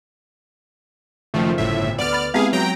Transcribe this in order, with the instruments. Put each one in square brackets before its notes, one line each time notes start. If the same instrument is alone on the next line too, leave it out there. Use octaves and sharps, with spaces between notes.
[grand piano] F#1 F4 C5 [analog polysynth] D#3 F3 A3
[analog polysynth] G1 A2 E5
[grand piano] D2 B3 D7 [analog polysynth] D5 F6
[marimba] B5 A6
[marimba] G#3 B3 C4 [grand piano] E4 G4 B4 [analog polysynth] G#4 F5
[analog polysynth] F#3 G5 A#5